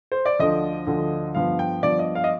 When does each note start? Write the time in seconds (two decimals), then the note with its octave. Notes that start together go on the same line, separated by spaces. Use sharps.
0.12 C5
0.26 D5
0.39 D2 D3 F3 D#5
0.87 D2 D3 F3
1.35 G2 F3 B3 F5
1.59 G5
1.83 G2 F3 B3 D5
1.99 D#5
2.15 F5
2.24 D#5